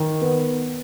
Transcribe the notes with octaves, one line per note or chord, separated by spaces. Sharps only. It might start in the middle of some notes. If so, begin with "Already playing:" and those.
Already playing: D#3
B3